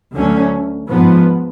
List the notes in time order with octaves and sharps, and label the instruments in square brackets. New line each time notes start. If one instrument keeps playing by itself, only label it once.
[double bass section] D2 D3 F#3 A3 C#4
G#2 F3 B3